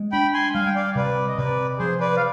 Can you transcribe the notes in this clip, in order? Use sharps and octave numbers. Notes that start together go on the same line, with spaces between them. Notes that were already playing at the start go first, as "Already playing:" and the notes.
Already playing: G#3
D4 G5 B5
G#5 C6
G3 F5 G#5
G5
D5 F5
C3 B4 D5
D#5
C3 B4 D5
F3 G#4 C5
B4 D5
F5